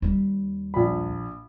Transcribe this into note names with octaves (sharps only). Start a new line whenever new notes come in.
D#2 G3
A#1 B5